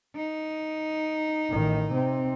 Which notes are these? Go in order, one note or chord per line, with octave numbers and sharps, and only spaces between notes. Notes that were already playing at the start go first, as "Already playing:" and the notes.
D#4
A1 D#3
C3 C4